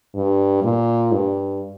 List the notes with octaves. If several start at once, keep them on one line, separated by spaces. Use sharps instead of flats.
G2
A#2
G2